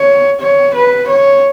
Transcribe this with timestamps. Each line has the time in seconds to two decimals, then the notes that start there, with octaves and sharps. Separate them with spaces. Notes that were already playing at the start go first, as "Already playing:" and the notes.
Already playing: C#5
0.40 C#5
0.74 B4
1.08 C#5